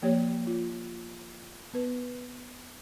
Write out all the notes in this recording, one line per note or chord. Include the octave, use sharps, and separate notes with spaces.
F3 A#3 G4 C#5
F4
B3 B4